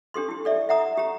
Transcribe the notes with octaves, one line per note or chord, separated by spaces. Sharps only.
D4 G4 A4 C6
E4 G4
A4 D5 E5
E5 F#5 A#5 D#6
G4 A#5